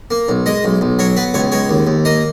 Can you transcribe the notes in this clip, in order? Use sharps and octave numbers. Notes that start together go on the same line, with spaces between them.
A#3
B1
G#3 D#5
B1
B1
F#3 C#5
B3 B4
C#2 C#5
G#3 C#5
D#2
D#2
A#3 D#5